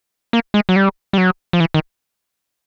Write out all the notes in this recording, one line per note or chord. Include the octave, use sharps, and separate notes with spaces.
A#3
G#3
F#3
G3
G3
F#3
F3
E3
D#3